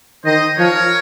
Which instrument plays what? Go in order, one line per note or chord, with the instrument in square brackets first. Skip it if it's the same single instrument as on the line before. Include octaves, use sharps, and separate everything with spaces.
[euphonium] D#3 [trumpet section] C5 D#5
[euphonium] F3 [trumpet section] A#4 C#5